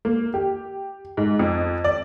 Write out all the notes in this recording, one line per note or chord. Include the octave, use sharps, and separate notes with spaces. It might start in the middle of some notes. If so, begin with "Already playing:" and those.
A#3
G4
G#2
F2
D5